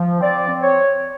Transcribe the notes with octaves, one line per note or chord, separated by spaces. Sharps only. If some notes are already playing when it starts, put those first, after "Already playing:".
Already playing: F3
C4 D5
C4
C#5